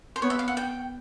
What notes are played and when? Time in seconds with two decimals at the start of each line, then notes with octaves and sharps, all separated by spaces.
0.16 C5
0.22 B3 C#5
0.30 E5
0.39 F5
0.48 F#5
0.57 G5